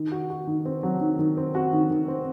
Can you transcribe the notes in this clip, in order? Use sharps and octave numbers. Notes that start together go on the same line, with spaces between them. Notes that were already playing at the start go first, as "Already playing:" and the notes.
Already playing: D#3
F#4
F#4
D#3
C4
F#3
D#3
D#3
C4
F#4
D#3
D#3
C4